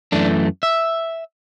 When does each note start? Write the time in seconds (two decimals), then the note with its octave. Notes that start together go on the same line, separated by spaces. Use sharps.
0.12 F#2 E3 A3 D4
0.63 E5